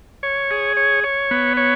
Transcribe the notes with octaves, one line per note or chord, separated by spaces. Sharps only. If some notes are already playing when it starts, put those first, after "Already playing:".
C#5
G#4
C#5
C#5
B3
C#5